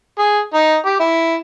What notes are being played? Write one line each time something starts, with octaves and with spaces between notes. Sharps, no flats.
G#4
D#4
G4
E4